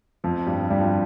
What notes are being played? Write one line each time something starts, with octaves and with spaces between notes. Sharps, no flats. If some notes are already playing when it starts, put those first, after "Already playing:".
F2 F3
G2 G3
G2 G3
F3